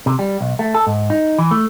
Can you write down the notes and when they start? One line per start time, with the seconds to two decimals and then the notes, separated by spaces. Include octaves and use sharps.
0.06 C3
0.19 G3
0.41 B1
0.59 A3
0.75 A4
0.87 G#2
1.10 D#4
1.38 E3
1.51 A3